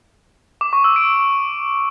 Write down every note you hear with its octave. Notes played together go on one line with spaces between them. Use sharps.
D6
C#6
E6
D7